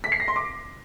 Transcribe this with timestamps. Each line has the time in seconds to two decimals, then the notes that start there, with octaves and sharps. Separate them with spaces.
0.04 B6
0.12 C7
0.20 A#6
0.28 C6
0.36 D6